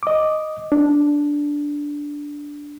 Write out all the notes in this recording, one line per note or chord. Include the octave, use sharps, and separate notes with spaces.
D#5 D6
D4